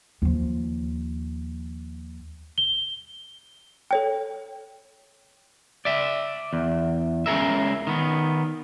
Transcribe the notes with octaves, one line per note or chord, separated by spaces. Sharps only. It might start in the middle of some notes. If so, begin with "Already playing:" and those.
D#2 F3
G7
A4 C#5 G5
D5 E5
E2
C#2 C#3 G#4 A#4 E5
D#3 B3